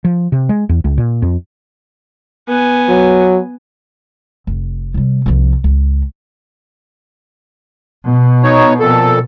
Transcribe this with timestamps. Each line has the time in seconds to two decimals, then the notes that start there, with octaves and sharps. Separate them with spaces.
0.05 F3
0.32 C3
0.49 G#3
0.69 E2
0.84 C#2
0.98 A#2
1.22 F2
2.48 B3 G#5
2.89 F#3
4.47 F1
4.94 C3 G3
5.26 C2 F3
5.64 C#2
8.06 B2
8.43 D#4 C#5
8.80 F2 A#2 A4